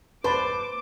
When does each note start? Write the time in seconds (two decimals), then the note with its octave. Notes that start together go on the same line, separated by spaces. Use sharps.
0.24 G#1 F2 B4 C5 A5 D6